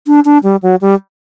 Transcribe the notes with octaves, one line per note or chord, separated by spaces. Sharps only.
D4
D4
G3
F#3
G3